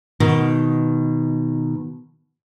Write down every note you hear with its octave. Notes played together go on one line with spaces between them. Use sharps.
B2 D#3